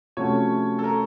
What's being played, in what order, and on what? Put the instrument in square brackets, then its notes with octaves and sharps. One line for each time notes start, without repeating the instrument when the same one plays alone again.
[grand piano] C3 F3 A3 C#4 F#4 [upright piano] C#5
[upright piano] A4
A#4